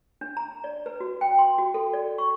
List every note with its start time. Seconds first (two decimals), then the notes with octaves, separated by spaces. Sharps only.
0.21 D4
0.37 A#5
0.64 D5
0.86 B4
1.00 F#4
1.21 G5
1.38 C6
1.58 F#4
1.74 A4
1.93 D5
2.18 C#6